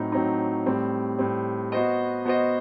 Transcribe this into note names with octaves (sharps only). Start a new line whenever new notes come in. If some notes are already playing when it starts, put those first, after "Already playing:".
Already playing: A2 F#3 C4 D#4
A2 F#3 C4 D#4
A2 G3 C4
A2 G3 C4
B3 F#4 C5 D#5
B3 F#4 C5 D#5